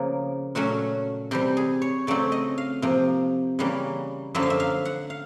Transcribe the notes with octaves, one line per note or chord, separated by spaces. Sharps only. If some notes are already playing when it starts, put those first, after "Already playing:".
Already playing: C#3 F3 A#3
A#2 F#3 A3 C#4 F#4
C3 E3 G3 G4
G#4
C#5
C#3 F#3 A3 C4 D5
D#5
F5
C3 F3 A#3
C#3 E3 G3 A#3
F#2 D3 F3 A#3 E5
F5
E5
F5
F#5
F5